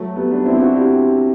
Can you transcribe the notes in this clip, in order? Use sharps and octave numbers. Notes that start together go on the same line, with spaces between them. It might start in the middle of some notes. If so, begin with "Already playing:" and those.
Already playing: F#3 A3
G3 B3
B3 D4
C4 E4
D4 F#4
E4 G4